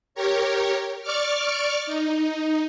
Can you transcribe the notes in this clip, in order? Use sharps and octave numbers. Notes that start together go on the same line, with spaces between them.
G4 A#4 C#5
D5 C#6 D6 F6
D#4